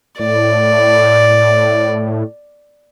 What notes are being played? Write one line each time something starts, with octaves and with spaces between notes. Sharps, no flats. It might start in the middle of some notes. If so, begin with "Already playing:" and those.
A2 D5